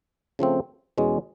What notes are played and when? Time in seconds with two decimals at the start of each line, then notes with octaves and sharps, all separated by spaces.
0.39 C#3 F3 A3 C4
0.98 E2 B2 G#3 C#4